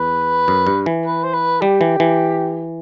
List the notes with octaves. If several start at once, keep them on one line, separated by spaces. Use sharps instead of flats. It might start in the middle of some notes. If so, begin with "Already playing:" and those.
Already playing: E2 B4
F#2
G2
E3
B4
C5
B4
G3 G4
E3
E3